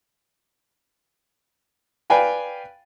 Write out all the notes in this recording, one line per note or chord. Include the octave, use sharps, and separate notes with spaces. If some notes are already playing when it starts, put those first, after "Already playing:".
B4 D5 F5 G5 G#5 B5